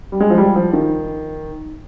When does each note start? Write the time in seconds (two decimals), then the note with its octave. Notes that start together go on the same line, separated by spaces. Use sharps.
0.12 G3
0.20 G#3
0.30 F3
0.38 G3
0.56 F3
0.73 D#3